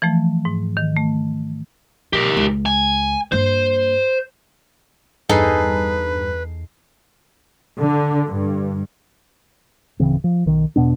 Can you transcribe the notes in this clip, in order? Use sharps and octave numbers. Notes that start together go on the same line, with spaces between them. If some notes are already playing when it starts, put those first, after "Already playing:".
E3 F3 A3
G#2
D#3
A3
B2 G4 A#4
C#2
G#5
G2 A#3 C5
E2 G2 D#4 G#4 A4 B4 C7
D3
G2
D1 C#3 E3 C4
F3
B1 D#3
E2 B2 B3 D4